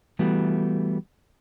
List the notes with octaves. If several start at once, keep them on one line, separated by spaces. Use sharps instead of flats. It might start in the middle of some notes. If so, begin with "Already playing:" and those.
E3 G3 A3 B3 F#4